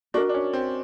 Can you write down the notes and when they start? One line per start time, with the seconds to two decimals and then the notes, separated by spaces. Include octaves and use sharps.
0.14 D4 F#4 A#4 D#5
0.29 D4
0.34 C#4
0.53 C4